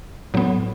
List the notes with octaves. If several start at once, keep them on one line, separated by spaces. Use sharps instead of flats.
A2 F#3 B3